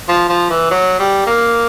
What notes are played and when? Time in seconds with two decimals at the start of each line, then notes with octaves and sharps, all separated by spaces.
0.09 F3
0.29 F3
0.50 E3
0.71 F#3
0.99 G3
1.27 A#3